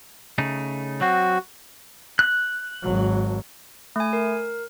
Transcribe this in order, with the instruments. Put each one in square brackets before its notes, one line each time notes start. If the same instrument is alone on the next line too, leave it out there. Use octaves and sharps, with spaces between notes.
[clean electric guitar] C#3 A3 D#4
[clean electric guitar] F#3 C4 [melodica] F#4
[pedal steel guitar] F#6
[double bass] G#1 F#3
[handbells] A3 G#5
A#4